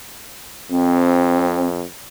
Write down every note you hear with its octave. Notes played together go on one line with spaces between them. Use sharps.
F2 C4